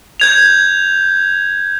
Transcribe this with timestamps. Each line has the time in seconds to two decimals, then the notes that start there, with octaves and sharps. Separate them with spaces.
0.20 G6 G#6 F7